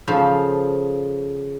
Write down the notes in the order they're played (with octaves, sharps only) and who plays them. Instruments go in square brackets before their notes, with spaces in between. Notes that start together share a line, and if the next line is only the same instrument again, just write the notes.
[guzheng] C#3 F3 A4 C5